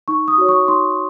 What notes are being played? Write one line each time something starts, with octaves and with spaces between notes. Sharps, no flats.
D#4 C#6
D#6
F#4 C#5
C#6
D#4 C6